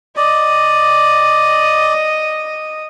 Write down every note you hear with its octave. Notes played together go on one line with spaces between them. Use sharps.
D5 D#5